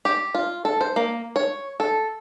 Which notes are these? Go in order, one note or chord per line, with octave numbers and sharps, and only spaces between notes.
G4
F4
A4
C5
A#3
C#5
A4